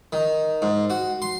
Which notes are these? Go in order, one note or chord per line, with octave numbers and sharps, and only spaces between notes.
D#3
G#2
F#4
C6